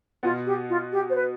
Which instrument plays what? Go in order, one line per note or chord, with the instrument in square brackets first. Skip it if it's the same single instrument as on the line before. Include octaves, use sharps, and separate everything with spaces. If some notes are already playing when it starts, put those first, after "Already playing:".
[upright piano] B2 B3 [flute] F4
[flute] G4
F4
G4
C5
B4